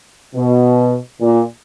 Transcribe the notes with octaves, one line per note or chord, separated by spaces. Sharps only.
B2
A#2